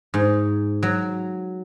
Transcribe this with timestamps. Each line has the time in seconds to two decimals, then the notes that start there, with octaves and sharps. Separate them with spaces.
0.14 G#2
0.83 F#3